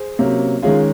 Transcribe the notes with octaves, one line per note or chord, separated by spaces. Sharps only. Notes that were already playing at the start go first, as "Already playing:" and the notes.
Already playing: G#4 C5
C3 F#3 A#3 C#4
D#3 G#3 C#4 F4 G#4